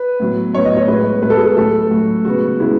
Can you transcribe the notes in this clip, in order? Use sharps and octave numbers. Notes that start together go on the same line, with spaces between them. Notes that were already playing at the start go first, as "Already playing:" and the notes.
Already playing: B4
A2 F#3 B3
A2 F#3 B3 C#5
D#5
C#5
A2 G#3 B3 B4
A2 G#3 B3 B4
A4
G#4
A4
A2 F#3 A3 A4
A2 F#3 A3 F#4
C#3 G#3 B3 F#4
C#3 G#3 B3 E4